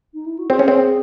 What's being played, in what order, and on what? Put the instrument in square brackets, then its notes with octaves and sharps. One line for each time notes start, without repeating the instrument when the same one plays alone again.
[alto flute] D#4
E4
F#4
[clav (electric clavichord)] C4 [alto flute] G#4
[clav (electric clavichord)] C#4
C4